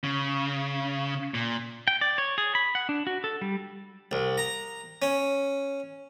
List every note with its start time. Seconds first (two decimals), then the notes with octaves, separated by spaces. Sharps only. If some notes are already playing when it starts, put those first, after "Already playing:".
0.04 C#3
1.34 A#2
1.88 G5
2.01 D5
2.18 C#5
2.38 G#4
2.55 B5
2.75 F#5
2.89 D4
3.07 F#4
3.24 A4
3.41 G3
4.11 C2
4.38 A#5
5.02 C#4